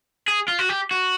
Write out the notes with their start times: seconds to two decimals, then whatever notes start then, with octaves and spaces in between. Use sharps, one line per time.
0.28 G#4
0.48 F4
0.59 F#4
0.69 G4
0.91 F#4